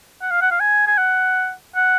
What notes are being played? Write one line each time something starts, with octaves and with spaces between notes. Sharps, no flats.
F#5
F5
F#5
F5
G#5
G#5
F#5
F#5